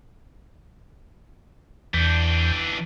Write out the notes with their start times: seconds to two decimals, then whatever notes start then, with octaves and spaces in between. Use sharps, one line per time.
1.94 E2 E3 D4 G6